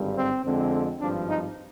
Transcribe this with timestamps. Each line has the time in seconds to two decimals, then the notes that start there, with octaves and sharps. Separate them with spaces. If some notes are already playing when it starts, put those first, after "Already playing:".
Already playing: G#1 G2 D3 G3
0.15 C4
0.43 F2 D3 G#3 C4
1.00 G#1 G2 F3 D4
1.29 D#4